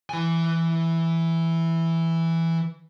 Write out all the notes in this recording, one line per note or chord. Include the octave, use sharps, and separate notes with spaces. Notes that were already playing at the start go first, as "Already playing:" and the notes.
E3 G#5